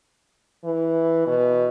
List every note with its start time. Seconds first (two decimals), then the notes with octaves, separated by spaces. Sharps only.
0.64 E3
1.27 B2